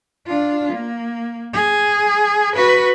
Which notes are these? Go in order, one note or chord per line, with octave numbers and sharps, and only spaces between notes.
D4 F4
A#3
G#4
F#4 B4